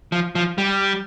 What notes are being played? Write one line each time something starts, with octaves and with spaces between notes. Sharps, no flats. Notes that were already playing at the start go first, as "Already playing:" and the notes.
F3
F3
G3